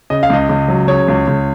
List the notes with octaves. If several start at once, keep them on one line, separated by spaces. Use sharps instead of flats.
C#3 D#5
F5
C#2 D#5
C#2
F#3
C#3 C#5
C#2
C#2